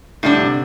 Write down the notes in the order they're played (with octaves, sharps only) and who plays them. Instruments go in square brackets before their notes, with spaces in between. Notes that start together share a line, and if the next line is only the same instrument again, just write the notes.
[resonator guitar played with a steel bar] A2 G3 D4 [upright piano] D3
[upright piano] C3